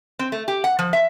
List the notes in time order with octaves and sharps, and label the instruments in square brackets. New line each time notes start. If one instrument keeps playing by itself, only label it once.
[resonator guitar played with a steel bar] C4
A3
G4
F#5
F3
E5